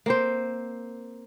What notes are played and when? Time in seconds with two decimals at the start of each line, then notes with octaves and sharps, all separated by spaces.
0.06 A#3 C4 C5